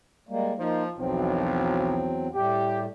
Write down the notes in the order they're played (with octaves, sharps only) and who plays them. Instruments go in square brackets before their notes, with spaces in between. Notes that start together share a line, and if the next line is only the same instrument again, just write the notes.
[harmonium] G3 G#3 A#3
[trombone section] F3 [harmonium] A#3 D#4
[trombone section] B1 F3 [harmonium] E2 F#3 C4
[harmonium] A2 G3 A3 [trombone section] G4